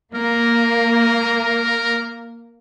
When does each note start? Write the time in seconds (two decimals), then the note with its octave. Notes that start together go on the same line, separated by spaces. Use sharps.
0.15 A#3 A#4